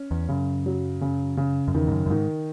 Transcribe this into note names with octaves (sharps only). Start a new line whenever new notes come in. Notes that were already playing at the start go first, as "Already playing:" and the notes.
Already playing: C#4
E2
F#2 C#3
F#3
C#3
C#3
F#2
E2 D#3
G#2
F#2
F#2
G#2 D#3